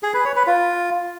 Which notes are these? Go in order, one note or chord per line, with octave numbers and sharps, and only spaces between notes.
G#4
B4
C#5
B4
F4